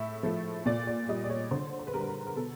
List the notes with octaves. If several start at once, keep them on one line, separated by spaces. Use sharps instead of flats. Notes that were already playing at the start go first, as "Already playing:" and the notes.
Already playing: A2 E5
F3 A3
A#2 D5
D5
G3 D#5
D5
C#5
D3 C5
C5
B4
G3 A#4
B4
A#4
A#4
B2 A4